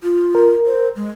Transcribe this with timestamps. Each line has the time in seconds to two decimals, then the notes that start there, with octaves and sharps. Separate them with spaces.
0.03 F4
0.35 A#4
0.66 C5
0.96 G#3